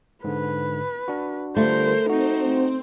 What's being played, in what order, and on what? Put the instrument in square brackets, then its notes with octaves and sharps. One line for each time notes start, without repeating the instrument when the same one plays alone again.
[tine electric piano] G#2 D3 [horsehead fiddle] B4
[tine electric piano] D4 F#4
[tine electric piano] D3 G3 F4 [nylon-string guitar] A3 [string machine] A#4 [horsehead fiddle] C5
[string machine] C4 C5 [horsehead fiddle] D#4 [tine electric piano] F#4